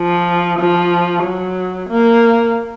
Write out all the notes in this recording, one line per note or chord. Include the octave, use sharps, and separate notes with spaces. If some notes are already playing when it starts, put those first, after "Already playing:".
Already playing: F3
F3
F#3
A#3